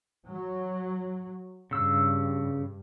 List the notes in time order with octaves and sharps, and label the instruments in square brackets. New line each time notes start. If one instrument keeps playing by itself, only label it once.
[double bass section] F#3
[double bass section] G2 [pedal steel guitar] C#3 E6